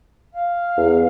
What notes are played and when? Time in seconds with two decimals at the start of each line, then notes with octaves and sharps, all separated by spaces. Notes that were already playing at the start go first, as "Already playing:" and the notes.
0.33 F5
0.77 E2